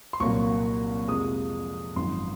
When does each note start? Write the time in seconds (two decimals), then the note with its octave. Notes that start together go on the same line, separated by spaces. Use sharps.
0.13 C6
0.20 C2 A#2 F#3 A#3 C#6
1.08 F2 C3 F3 G#3 D#6
1.96 G#1 F#2 F3 C6